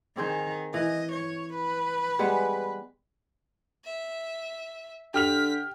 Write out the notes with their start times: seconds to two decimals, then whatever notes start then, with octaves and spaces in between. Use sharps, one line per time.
0.17 D#3 C4 G#4 C5
0.74 E3 D#5
1.13 C#5
1.54 B4
2.19 G3 G#3 B3
3.85 E5
5.14 D3 G4 F6 B6 F7